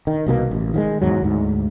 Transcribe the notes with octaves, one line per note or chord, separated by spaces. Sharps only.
D#3
C2 B2 D#3 A#3
A1
D#3 F3 G#3
E2 G#2 F#3
D2 G#2